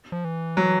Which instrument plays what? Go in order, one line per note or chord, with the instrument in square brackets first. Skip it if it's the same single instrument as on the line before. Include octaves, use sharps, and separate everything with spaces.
[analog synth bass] F3
E3
[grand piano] F#3